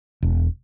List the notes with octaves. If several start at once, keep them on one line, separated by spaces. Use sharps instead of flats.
E1